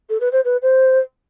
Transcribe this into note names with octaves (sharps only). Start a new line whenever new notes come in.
A4
B4
C5
B4
C5